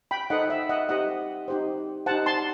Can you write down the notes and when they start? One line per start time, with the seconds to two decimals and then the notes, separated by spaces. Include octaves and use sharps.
0.11 G5 B5
0.30 D#4 A4 C5 D#5 F#5
0.50 E5
0.69 D#5 F#5
0.89 D#4 G4 C5 D#5 F#5
1.48 D#4 G4 C5
2.06 D#4 G4 C5 F#5 A5
2.26 A5 C6